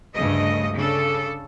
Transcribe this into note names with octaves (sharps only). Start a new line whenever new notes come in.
D2 G2 C#3 A3 D#5
C#3 D4 A4